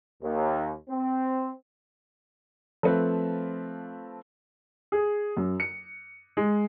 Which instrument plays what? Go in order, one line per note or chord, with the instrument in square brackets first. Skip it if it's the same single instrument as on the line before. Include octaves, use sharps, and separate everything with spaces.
[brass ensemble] D#2
C4
[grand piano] F3 A3 C4 B4
[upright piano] G#4
F#2
C#7
G#3